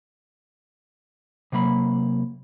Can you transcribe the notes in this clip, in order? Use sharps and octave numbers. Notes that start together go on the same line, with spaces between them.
C3 F#3 A#3 B5